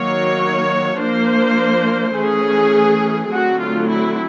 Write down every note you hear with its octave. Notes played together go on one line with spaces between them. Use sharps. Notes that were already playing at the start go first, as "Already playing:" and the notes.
Already playing: D#3 F#3 A#3 C#5
F3 A#3 D4 C5
E3 A3 C#4 G#4
D3 F#3 A3 C4 F#4
F4
E4